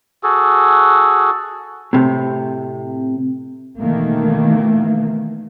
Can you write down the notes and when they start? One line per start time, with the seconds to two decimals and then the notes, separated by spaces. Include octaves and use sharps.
0.23 F#4 G#4 A4
1.93 A2 C3
3.77 B2 D#3 E3 A3 A#3